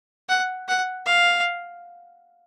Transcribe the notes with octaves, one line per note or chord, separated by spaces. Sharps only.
F#5
F#5
F5